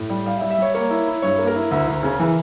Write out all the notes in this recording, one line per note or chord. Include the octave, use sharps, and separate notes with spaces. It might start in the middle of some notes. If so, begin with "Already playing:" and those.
Already playing: A2
G3
G3 F5
G3 E5
E5
G3 C#5
A#3 C#5
E4
E4
G2 C#5
A#3
A#4
E4
D2
D2
C#3
E3